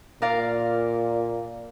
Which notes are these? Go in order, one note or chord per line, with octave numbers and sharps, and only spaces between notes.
A#2 A#4 D5 F5